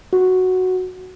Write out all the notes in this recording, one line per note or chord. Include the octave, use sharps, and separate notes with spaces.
F#4